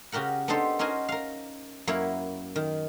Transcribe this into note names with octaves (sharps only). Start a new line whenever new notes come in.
C#3 F#4 G4 A#4 F#5
B3 D4 D#4 G4 A4 C5
C#4 D#4 F#4 A#4 C5 G#5
A#4 F5
F#2 A#3 E4 C#5 E5
D#3